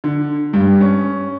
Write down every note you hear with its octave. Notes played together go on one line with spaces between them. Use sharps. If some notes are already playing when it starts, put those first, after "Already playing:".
D3
G2
C#4